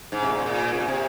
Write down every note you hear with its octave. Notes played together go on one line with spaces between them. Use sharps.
G#2
C3
A#2
A#2
C3
A#2
C3